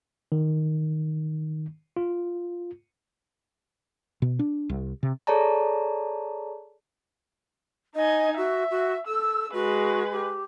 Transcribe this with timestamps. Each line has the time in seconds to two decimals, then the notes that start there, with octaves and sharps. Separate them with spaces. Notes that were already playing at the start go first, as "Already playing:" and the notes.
0.32 D#3
1.97 F4
4.22 B2
4.39 D4
4.69 C2
5.03 C3
5.27 G#4 A4 C#5 D5 A5 A#5
7.95 D#4 D#5 G#5
8.37 F#4 E5
8.71 F#4
9.07 A4 E6
9.53 G#3 F#4 B4
10.11 G4